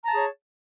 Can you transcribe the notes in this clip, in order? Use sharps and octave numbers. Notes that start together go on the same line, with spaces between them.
G#4 C#5 A5 A#5